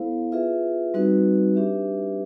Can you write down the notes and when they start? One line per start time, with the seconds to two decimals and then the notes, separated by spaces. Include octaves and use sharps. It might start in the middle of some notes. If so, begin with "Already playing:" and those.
Already playing: B3 E4 A4 C5 F5
0.32 F4 G#4 B4 E5
0.94 G3 C4 D#4 F#4 B4
1.56 D4 G4 B4 E5